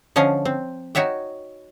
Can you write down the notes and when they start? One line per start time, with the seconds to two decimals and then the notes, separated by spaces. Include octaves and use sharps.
0.16 D3 F3 C#4 D#5 F5
0.45 C4
0.95 D#4 F#4 C#5 E5 G5